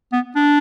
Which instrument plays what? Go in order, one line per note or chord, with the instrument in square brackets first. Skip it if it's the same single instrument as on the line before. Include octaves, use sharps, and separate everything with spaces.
[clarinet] B3
D4